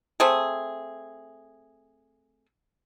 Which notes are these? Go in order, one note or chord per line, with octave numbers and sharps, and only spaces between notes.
A3 C4 G#4